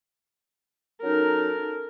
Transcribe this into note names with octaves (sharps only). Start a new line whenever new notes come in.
F#3 C#4 D#4 A4 A#4